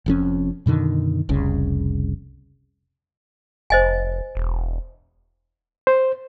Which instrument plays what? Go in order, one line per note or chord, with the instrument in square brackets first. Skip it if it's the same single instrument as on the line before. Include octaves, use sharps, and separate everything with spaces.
[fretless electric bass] F1 F2 C#4
F#2 B2 D3 D#3
F1 C2 C#3
[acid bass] F1 [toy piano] C5 D#5 G#5
[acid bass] E1
[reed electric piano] C5